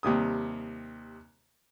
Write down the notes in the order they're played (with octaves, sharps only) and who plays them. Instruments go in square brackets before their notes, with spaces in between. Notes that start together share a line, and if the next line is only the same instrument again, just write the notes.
[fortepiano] D#2 C3 G3 D#6